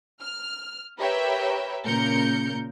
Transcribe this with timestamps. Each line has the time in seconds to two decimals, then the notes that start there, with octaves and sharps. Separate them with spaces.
0.21 F6
0.98 G4 A#4 B4 C#5 E5 G5
1.84 A#2 C#3 A#4 G6 C#7